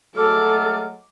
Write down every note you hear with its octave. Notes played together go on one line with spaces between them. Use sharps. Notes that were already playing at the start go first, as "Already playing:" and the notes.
F#3 G#3 A3 A4 D6 F6